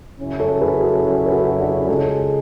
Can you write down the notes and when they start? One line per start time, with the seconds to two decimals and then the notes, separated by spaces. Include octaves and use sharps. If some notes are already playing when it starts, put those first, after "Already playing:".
0.18 F#2 C#3 F#3 C#4 E4
0.40 A4 C#5
0.61 G#4 B4
0.82 F#4 A4
1.03 F#4 A4
1.26 B4
1.32 F#4 A4
1.60 D4 F#4
1.88 C#2 C#3 G#3 A4 C#5